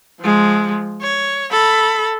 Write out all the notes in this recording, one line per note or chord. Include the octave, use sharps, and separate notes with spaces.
F3 G#3
C#5
A4 B5